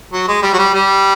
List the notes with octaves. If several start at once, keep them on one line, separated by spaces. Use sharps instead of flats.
F#3
G#3
G3
F#3
G3
G3